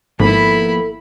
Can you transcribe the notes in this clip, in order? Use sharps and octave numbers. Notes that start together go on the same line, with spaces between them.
G#1 F3 A#3 B3 E4 A4 B5